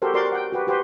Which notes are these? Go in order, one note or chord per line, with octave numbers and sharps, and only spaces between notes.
F#4 G4 A4 A#4 C5
F#4 G4 A#4 D5 C6 D6
F#5 G5
F#4 G4 B4
F#4 G4 B4 C5